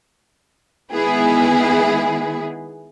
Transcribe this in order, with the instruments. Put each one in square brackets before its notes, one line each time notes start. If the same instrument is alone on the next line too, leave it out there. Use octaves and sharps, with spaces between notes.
[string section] D#3 G#3 B3 E4 G#4